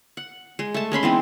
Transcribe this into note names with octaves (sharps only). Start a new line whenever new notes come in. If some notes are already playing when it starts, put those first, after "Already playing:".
F#5
G#3
A3 A5
G#3 C#4 B5 C6
E3 B3 C4 D#4